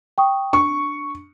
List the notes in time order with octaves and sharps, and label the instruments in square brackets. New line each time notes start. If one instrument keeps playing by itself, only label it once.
[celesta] G5 C#6 D#6
[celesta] D4 [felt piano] C#6